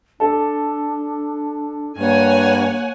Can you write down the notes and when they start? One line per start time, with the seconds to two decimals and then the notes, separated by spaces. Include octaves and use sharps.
0.20 D4 A4
1.98 G2 A#3 C#5 F#5 G#5